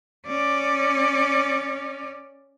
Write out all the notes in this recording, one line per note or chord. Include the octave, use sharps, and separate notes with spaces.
C#4 D5